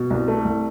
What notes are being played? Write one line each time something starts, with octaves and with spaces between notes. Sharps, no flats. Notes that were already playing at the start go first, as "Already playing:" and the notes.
Already playing: B2
C2
A3
C2